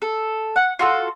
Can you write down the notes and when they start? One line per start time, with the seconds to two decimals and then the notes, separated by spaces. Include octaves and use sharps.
0.02 A4
0.56 F#5
0.79 F4 F#4 A4